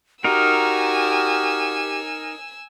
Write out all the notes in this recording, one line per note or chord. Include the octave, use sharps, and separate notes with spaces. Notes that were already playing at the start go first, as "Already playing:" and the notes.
D#4 F#4 G4 A#4 G#5 E6